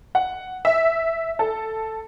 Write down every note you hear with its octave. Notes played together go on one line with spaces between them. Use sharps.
F#5
E5
A4